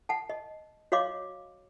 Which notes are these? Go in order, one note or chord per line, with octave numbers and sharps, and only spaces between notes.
F#5 A5
D#5
F#4 C#5 D#5 F5 C6 D6